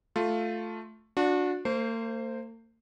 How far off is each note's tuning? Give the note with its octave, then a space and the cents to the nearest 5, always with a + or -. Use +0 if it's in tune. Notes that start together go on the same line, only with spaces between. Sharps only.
A3 +0 F4 +5
D4 +0 F#4 -30
A#3 -45 C5 +0